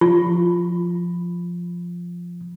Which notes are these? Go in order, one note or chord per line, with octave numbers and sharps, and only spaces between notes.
F3 F4